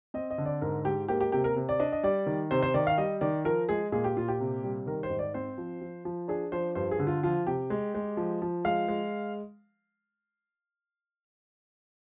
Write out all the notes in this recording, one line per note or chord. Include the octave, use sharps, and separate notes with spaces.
C4 D#5
D#5
D3
D5
G#2 A#4
G#3 G4
A#3 G4
G4
C3 G4
A#4
C3
D5
D4 D#5
D#5
G3 D5
D#3
C3 C5
C5
D#3 D5
F5
G3 D#5
D#3 D5
F3 A#4
G#3 G#4
A#2 G#4
G4
A#2 F4
G4
C3
G3
D#3 A#4
C5
G#2
D5
C4 C5
F3
F3
F3
D4 G#4
F3 C5
G2 C5
G#4
D3
F4
F3 F4
C3 G4
G#3
G#3
F3
F3
G#3 F5
G#3